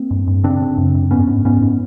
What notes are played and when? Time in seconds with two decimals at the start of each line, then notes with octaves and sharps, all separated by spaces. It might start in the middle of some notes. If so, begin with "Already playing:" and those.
Already playing: A#3 C4
0.11 G2
0.28 G2
0.44 C#3 C4 D4
0.61 C#3
0.77 F#2
0.95 F#2
1.11 G#2 B3 C#4
1.27 G#2
1.45 G#2 B3 C#4
1.61 G#2